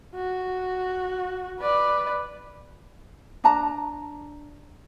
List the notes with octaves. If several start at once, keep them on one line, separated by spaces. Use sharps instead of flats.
F#4
B4 D5
D4 A5 A#5